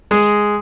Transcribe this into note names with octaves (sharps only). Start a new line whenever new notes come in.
G#3